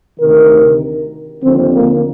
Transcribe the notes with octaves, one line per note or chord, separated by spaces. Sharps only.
D2 C3 D#3 A#4
D#2 D3 F3 C4
A#3